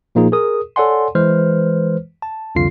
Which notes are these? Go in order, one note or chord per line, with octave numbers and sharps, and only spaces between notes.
A#2 F3 A#3 D#4 F4 G#4
G#4 A#4 D#6
A4 C#5 D5 F#5 G#5 C6
E3 G#3 B4 C5 F6
A5
C2 F2 D3 F4 C7